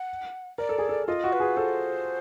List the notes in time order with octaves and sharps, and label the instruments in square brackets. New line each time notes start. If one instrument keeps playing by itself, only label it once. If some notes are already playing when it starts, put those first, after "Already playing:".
Already playing: [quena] F#5
[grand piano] A#4 [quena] D5
[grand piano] A4
G#4
A4
[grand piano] F4 [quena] D#5
[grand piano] F#4
[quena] B4
[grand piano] G#4
[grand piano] A4 [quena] C5